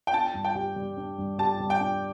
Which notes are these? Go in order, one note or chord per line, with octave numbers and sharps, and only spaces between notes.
G5
D4 A5
G2
G5
G4
G3
D4
G2
G4 A5
G3
G5
D4